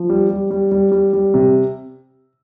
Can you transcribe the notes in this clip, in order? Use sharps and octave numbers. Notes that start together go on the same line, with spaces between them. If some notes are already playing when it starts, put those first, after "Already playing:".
Already playing: F3
G3
G3
G3
G3
G3
G3
C3